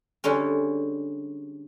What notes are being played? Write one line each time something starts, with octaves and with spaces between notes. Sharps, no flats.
D3 G3 G#3 C#4